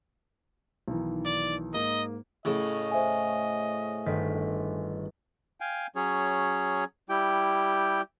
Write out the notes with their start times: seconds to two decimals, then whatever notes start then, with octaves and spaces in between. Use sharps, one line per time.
0.88 B1 D#3 E3
1.25 D5
1.74 G#2 A#3 D#5
2.45 A2 C#3 D#5
2.91 C5 E5 G#5
4.06 G1 D#3 B6
5.60 F5 G5 G#5
5.96 F#3 C#4 G#4 C#5
7.09 G3 E4 G4 G5